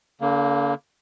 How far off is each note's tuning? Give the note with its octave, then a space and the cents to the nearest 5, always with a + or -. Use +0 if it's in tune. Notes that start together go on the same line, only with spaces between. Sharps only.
D3 -45 A#3 +0